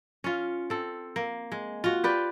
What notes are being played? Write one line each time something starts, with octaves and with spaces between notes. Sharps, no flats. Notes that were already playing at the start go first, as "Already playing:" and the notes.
C#4 F4
C4 A4
A#3
G#3
F4 F#4
G4 B4 D5